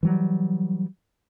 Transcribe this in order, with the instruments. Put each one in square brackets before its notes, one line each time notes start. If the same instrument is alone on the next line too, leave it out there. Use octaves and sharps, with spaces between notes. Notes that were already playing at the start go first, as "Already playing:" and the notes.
[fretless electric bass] E3 F#3 G3